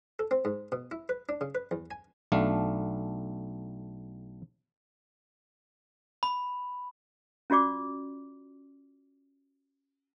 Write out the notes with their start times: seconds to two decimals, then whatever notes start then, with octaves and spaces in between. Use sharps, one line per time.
0.19 A4
0.31 C4
0.45 G#2
0.72 B2
0.91 E4
1.09 B4
1.29 D4
1.41 C#3
1.55 B4
1.71 E2
1.91 G#5
2.32 B1 A3 D4 F5
6.23 B5
7.50 C#4 F4 F#4 D5 D6